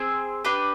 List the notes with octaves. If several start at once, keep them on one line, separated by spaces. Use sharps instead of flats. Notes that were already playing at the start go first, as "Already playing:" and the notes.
Already playing: C4 G#4 C5
D4 G4 B4